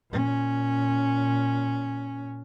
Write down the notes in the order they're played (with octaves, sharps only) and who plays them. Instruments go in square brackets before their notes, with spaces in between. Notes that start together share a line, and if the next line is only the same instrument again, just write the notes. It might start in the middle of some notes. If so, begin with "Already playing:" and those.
[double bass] A#2 C#4